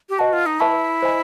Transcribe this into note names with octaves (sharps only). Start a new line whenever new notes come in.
G4
F#4 B4 D#5 F#5 A5
F4
D#4
E4 B4 E5 A5 C#6
C5 D#5 G#5 B5